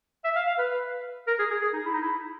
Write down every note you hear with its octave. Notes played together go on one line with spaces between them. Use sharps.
E5
F5
F5
B4
A#4
G#4
G#4
G#4
D#4
E4
D#4
E4